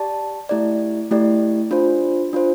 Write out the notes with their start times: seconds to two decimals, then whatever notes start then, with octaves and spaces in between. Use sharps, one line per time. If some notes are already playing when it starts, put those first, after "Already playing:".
Already playing: G4 D5 A5
0.49 A3 E4 G4 D5
1.11 A3 E4 G4 D5
1.71 D4 F4 C5
2.33 D4 F4 C5